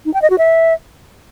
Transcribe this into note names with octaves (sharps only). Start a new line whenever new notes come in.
D#4
G5
D#5
F#4
E5